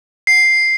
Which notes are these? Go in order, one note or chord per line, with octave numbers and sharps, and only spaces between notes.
C7